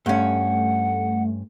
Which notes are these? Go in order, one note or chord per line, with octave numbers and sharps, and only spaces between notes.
G2 A3 C#4 F#5